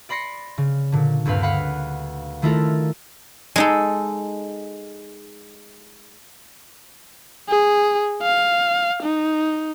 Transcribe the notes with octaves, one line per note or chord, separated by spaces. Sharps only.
D5 B5 C6 A#6 C7 C#7
C#3
A#2 D3
D2 G2 C4 B4 F5
B4 F5 F#5 B5
D#3 A3 E4 F4 A4 A#4
G#3 D#4 A4
G#4
F5
D#4